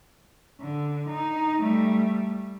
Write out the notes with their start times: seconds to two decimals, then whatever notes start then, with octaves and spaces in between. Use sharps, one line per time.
0.60 D3
1.09 D#4
1.61 G3 A3